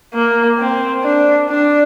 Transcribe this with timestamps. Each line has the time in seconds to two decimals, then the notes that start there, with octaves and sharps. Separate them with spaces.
0.14 A#3
0.59 C4
1.03 D4
1.49 D4